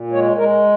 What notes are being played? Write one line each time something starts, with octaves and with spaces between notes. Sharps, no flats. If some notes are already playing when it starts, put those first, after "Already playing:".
Already playing: A#2
G#3 C#5
G#3 A#4